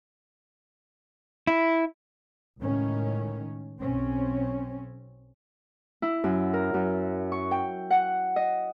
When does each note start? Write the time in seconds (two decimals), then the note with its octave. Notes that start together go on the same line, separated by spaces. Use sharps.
1.47 E4
2.59 C#2 A2 D#3 C#4
3.81 B1 C4 C#4
6.02 E4
6.24 F#2
6.54 A#4
6.74 F#2
7.32 C#6
7.51 G5
7.90 F#5
8.36 D#5